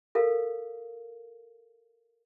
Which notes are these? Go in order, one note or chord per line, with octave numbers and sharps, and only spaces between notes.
A4 A#4 F5